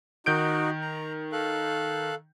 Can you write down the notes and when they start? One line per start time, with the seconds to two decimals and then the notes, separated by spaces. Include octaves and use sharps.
0.26 D#3 D#4 F#4 G6 D7
0.81 A#5
1.32 A4 F5 F#6